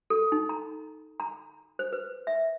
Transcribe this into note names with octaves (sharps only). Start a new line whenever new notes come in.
A4
D#4
A#5
A#5
C5
B4
E5